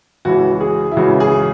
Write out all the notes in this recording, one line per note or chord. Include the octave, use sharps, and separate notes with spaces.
C#2 C#3 E3 F#4
G#4
E4
C#2 C#3 E3 F#4
G#4